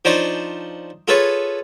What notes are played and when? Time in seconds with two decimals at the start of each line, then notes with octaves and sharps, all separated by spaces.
0.05 F3 D4 D#4 C5 C#5
1.08 F4 G#4 A4 B4 C#5